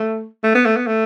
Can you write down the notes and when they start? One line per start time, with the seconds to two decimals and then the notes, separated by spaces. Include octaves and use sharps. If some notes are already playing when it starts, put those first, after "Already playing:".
Already playing: A3
0.44 A3
0.55 B3
0.66 A3
0.77 B3
0.87 A3